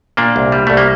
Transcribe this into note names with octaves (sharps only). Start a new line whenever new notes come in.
A#2 A#3 D4
C2
G3
C2 A3
A#3